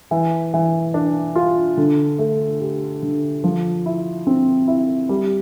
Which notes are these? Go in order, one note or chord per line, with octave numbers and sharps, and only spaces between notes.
E3
E3
D4
F4
D3
A3
G4
D3
F3
E4
C4
E4
G3